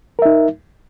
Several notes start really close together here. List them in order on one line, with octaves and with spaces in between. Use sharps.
A#4 E5 D#4